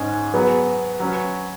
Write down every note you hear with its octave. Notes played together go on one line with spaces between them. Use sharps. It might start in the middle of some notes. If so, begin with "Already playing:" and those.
Already playing: G#2 G#3 C#4 G#4
F#3 B3 G#4 B4
F#3 C#4 B4